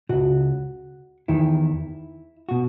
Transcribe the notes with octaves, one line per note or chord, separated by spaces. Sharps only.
C#2 B2 F#4
E2 D#3 E4
B2 F#4